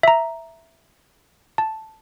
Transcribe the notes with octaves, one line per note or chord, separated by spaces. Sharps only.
E5 A#5
A5